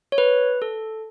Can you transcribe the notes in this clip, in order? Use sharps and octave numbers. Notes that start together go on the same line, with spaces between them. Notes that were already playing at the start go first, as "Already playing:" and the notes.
C#5
B4
A4